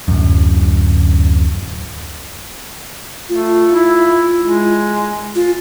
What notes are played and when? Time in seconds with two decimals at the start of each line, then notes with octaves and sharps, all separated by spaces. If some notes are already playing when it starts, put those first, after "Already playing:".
0.08 D1 F#2
3.29 A3 F4
3.69 E4
4.43 G#3
5.35 F4